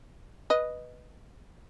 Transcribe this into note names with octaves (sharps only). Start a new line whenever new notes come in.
B4 D#5